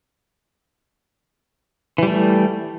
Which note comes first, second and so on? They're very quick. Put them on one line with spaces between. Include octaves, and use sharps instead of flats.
E3 G3 A3